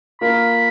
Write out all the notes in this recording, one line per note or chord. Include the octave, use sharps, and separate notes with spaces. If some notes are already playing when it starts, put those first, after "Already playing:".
A#3 F4 A#4 B5